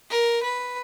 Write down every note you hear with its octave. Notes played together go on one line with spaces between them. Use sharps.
A#4
B4